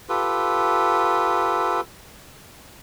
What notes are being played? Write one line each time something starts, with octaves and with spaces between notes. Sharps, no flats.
F4 G4 A4 B4